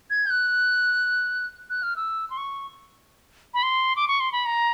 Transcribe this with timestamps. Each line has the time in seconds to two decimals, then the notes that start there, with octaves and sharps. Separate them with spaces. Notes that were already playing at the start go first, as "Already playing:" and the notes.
0.10 G#6
0.26 G6
0.30 F#6
1.70 F#6
1.83 F6
1.96 E6
2.30 C6
2.37 C#6
3.54 B5
3.63 C6
3.96 D6
4.08 C#6
4.20 C6
4.32 B5
4.46 A#5